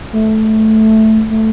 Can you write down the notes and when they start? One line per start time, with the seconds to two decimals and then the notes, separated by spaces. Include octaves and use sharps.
0.13 A3
1.30 A3